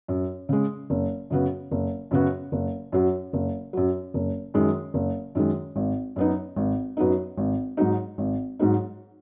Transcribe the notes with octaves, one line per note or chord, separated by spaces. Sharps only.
F#2
C#3 G#3
F#1
F#2 C#3 B3 F#4
F#1
F#2 C#3 B3 F#4
F#1
F#2 F#3
F#1
F#2 F#3
F#1
F#2 D#3 G#3
F#1
F#2 D#3 G#3
G#1
F#2 F#3 B3 D#4
G#1
F#2 F#3 B3 D#4
G#1
G#2 F#3 D#4
G#1
G#2 F#3 D#4